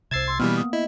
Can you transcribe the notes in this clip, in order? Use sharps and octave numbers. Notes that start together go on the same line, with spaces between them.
C2 C3 C5 E6 G#6 A6 C7 E7
C6 E6
B2 E3 G3 A#3 B3 B5 F6
D#6
E4 D#5